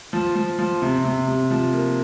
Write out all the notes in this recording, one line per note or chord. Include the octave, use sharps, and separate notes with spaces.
F3
F3
F3
C3
C3
C3
F3
A#3